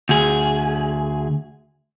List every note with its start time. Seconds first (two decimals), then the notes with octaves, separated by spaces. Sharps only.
0.09 D2 G#4